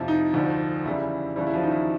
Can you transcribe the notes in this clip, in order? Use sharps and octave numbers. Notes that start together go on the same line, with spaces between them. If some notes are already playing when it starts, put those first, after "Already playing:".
Already playing: F2 C3 F3 E4
D#4
D2 D3 F3
E2 C#3 E3 G3 E4
D#2 C#3 E3 G3 E4
E4
F3 F4
D#4
E4